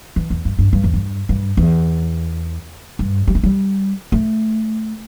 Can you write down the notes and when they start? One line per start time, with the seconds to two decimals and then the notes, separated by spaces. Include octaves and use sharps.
0.16 E3
0.30 E2
0.45 G2
0.59 G2
0.73 G2
0.84 E2
0.94 G2
1.29 G2
1.57 E2
2.99 G2
3.28 G3
3.35 A3
3.43 G3
4.12 A3